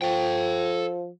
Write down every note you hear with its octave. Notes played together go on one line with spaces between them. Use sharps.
F3 A4 G5